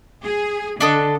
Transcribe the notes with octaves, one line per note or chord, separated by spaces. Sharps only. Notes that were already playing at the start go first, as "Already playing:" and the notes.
G#4
D3 D4 A4 D#5